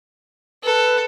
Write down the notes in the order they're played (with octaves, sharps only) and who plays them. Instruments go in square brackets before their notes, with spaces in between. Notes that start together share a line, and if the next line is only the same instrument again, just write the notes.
[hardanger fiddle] A4 [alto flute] B4